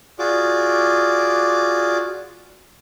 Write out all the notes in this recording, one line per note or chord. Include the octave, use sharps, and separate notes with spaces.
F4 F#4 G#4 D5 D6